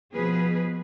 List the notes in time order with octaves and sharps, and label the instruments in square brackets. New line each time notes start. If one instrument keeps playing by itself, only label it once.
[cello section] B2 F3 G#4 B4